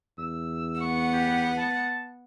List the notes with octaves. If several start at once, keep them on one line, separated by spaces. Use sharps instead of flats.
E2 E6
B3 F#5 C#6
G4
A5